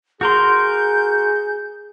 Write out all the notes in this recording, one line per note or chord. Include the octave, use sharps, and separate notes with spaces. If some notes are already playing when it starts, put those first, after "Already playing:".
F#4 G#4 A#4 C6 G6